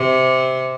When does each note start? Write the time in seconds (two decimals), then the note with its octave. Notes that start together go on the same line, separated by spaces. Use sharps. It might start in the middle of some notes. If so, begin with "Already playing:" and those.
Already playing: C3